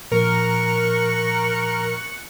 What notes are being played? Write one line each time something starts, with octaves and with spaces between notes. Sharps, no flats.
A#2 F3 A#4 C#6 F#6